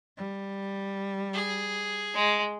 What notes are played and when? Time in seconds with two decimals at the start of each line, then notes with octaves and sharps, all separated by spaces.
0.18 G3
1.34 G#4
2.14 G#3